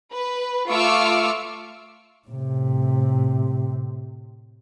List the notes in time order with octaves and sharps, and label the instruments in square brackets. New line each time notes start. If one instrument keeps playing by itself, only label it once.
[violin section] B4
A3 F4 C#6 D6 E6 F6
[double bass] A2 C3